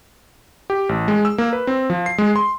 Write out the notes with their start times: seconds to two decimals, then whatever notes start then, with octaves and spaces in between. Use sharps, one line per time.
0.70 G4
0.89 A1
1.08 G#3
1.25 E6
1.38 A#3
1.53 B4
1.67 C4
1.90 F3
2.06 C7
2.18 G#3
2.36 C6